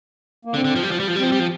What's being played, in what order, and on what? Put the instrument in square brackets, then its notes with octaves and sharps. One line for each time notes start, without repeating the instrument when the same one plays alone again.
[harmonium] A#3
[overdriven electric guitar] D3 [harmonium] C4
[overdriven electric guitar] D3
F3
G3
F3
G3
F3
G3
[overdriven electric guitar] F3 [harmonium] C4
[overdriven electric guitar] G3
F3